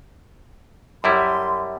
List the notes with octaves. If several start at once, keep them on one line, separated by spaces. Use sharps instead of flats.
F#2 G3 E4 C6